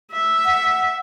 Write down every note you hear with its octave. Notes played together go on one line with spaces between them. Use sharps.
E5
F#5